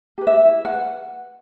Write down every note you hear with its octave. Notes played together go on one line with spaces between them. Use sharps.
G4 B4
E5
E4
F#5
B4